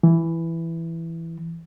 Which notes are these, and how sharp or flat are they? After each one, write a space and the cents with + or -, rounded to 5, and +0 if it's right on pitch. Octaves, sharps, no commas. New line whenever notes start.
E3 +5